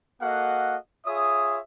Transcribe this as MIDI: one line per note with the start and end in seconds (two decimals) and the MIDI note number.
0.22 0.76 58
0.22 0.76 66
0.22 0.76 69
0.22 0.76 75
0.22 0.76 77
0.22 0.76 78
1.06 1.59 65
1.06 1.59 68
1.06 1.59 73
1.06 1.59 76
1.06 1.59 87